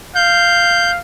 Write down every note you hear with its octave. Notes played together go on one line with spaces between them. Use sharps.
F5 G6